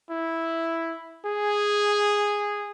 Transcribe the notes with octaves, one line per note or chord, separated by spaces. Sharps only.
E4
G#4